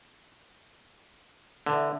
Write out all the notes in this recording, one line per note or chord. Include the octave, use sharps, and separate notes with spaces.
D3 E3 B3